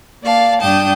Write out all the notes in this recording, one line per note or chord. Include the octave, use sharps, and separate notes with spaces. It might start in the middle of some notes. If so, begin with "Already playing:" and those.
A#3 D5 F5 A5
G2 D4 G5 A5 D#6